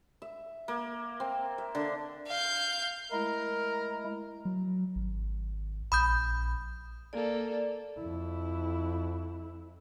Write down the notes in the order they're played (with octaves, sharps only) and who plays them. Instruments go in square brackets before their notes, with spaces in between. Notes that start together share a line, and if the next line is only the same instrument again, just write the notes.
[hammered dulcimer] E5
A#3
C4
E5
D3
[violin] F5 G6
[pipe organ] G#3 A3 E4 [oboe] A#4
[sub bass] F#3
G#1
[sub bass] A#1 [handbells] B5 D#6 G6
[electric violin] A#3 A4 [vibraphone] D5
[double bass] F2 E4